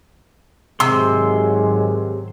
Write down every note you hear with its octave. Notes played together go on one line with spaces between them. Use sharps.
G#2 C3 D#3 F#3 G#3 C6 E6